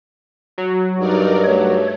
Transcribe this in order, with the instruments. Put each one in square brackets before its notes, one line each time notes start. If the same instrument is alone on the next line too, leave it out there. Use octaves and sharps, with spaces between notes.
[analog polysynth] F#3
[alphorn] G2 [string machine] D#4 A#4 D5
[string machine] A3 [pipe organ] C#5